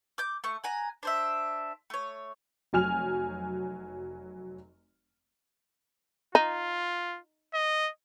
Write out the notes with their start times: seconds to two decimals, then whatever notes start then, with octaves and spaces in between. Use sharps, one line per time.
0.18 D6 G6
0.44 A3 C#6
0.64 F#5 G#5 A#5
1.03 D4 C5 E5
1.90 A3 C#5
2.73 F1 F#3 G#5 F6 F7
6.35 D#4 F4
7.54 D#5